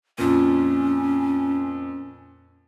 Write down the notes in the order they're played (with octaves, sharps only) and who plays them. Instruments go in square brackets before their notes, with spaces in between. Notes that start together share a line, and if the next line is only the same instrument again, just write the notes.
[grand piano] F2 A#2 [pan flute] C#4